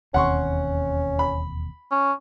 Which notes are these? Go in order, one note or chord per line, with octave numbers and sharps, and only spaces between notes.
E1 D#2 C4 C#4 F#5 C6 C#6
B5
C#4